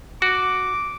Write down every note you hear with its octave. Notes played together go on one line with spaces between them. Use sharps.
F#4 D6